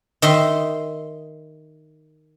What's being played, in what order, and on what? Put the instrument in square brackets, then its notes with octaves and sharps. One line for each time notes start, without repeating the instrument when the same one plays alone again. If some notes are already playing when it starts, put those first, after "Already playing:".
[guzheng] D#3 D#5 E5 C6